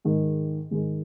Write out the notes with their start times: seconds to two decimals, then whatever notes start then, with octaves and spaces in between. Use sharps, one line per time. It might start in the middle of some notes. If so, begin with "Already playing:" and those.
0.05 G#2 D#3 G#3
0.71 G#2 D#3 G#3